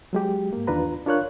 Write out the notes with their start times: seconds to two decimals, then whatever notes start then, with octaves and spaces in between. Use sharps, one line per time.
0.13 F#3 G#3 G4
0.53 G#2 A#3
0.67 E2 D#3 D4 F4 B4 A#5
1.06 D4 F4 A#4 C#5 F5 F#6